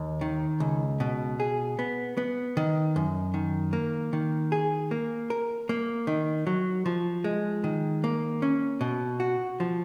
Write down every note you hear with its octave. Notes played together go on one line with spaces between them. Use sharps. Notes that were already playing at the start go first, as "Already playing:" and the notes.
Already playing: D#2
D#3
C#2
B2
G#4
B3
B3
D#3
F#2
D#3
A#3
D#3
G#4
A#3
A#4
A#3
D#3
F#3
F3
G#3
D#3
A#3
C#4
B2
F#4
F3